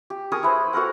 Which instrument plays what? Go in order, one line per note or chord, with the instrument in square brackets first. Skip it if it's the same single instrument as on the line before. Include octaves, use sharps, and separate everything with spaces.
[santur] G4
G#4 A#4 C#6 D#6
E4 B4 C5
F#4 A4 A#4 F#5